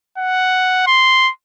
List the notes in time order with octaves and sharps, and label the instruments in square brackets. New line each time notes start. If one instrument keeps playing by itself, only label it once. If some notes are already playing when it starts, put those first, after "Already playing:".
[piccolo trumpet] F#5
C6